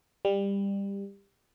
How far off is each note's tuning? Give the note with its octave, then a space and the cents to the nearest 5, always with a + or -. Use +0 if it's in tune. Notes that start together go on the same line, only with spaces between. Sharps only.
G3 +20